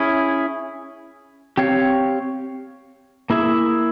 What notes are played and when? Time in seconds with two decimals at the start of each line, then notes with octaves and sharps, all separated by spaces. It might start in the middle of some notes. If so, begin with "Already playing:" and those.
Already playing: C#4 E4 G#4
1.57 C4 G4 C#5 F5
3.30 A#3 E4 G#4 E5